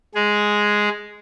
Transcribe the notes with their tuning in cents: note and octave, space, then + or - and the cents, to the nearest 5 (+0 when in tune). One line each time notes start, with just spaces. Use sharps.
G#3 +0 G#4 +0